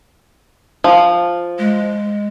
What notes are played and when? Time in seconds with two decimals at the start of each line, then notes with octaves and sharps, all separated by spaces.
0.84 F3
1.59 G#3